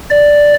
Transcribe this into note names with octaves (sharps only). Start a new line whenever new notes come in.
D5